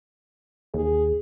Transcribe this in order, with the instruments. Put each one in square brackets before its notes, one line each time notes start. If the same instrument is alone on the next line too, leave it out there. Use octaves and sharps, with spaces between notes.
[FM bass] D#2 [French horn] G#4